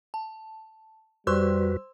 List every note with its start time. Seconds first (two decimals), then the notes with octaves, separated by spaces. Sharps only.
0.14 A5
1.27 F2 G3 F#4 B4 C5 C6 E6